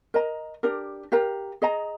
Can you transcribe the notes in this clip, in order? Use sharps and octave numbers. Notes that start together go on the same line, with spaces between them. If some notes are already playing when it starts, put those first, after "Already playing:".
A#4 D#5 A#5
D4 G4 A#4
G4 A#4 F5 A#5
G#4 D#5 A#5